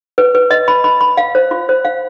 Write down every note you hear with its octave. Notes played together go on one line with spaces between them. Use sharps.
B4
B4
D#5
B5
B5
B5
F5
C5
F4
C5
F5